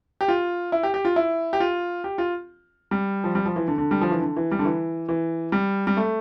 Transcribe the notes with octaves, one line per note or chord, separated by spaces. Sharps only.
G4
F4
E4
G4
G4
F4
E4
G4
F4
G4
F4
G3
F3
G3
F3
E3
D3
D3
G3
F3
E3
D3
E3
G3
D3
E3
E3
G3
G3
A3